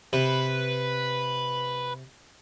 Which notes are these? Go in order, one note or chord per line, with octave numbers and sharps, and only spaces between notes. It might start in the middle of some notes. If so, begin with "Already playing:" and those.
C3 B4